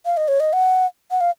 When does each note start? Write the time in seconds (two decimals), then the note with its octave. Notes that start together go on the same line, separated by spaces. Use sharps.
0.06 F5
0.17 D#5
0.28 C#5
0.40 D#5
0.53 F#5
1.11 F#5
1.21 F5